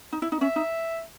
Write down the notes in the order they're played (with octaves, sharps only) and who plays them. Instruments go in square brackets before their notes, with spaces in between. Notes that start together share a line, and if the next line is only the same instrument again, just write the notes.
[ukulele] D#4
E4
D#4
[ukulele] C#4 [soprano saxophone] E5
[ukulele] D#4